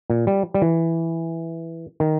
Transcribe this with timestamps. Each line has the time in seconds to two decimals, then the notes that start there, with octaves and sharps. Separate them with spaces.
0.10 A#2
0.27 G3
0.54 G3
0.62 E3
2.00 D#3